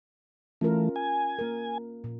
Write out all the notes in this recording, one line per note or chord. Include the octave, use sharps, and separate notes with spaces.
E3 A3 C#4 F4 A#4
G#5
A#3 A#4
A#2